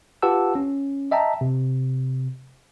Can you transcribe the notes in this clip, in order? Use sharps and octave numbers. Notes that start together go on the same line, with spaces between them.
F4 G4 B4 F#5 A5 E6
C#4
D#5 E5 G5 A5 A#5
C3